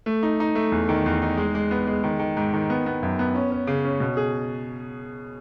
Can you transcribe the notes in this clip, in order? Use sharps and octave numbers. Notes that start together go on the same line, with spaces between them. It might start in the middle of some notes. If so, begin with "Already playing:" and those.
A3
D#4
D#4
A3
E2
D#3
E2
D#4
G#3
G#3
B3
G#3
D#3
D#3
G#2
D#3
B3
B3
F#2
B3
C#4
C#4
C#3
C#4
B2
G#4